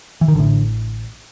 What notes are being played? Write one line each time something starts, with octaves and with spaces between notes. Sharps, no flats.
E3
D#3
A1 A2 D3